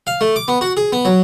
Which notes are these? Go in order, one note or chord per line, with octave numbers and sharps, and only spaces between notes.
F5
A3
D6
B3
F#4
G#4
B3
F#3